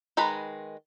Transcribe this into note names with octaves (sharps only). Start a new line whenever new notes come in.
D#3 G#3 B4 A#5 B5